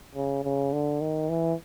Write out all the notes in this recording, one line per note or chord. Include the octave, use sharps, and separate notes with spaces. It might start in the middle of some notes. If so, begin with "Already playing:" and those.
C#3
C#3
D3
D#3
E3